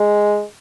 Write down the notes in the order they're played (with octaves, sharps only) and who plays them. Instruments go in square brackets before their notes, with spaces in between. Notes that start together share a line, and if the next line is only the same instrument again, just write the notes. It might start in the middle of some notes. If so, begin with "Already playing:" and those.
Already playing: [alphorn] G#3